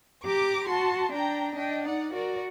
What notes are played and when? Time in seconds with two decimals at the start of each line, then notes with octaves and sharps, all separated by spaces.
0.25 G4 A#5 D6
0.69 F#4 A5 C6
1.12 D4 G5 A#5
1.56 D4 D#5 G5
1.85 D#4 D5 F#5
2.14 F#4 A#4 D5